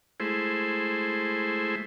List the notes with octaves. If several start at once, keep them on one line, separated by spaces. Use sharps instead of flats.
G#3 A3 E4 C5